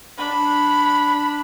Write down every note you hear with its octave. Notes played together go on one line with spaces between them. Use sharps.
D4 B5